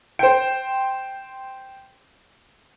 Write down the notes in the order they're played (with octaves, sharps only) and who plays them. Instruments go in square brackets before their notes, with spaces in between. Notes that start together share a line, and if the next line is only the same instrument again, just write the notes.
[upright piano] C5 G5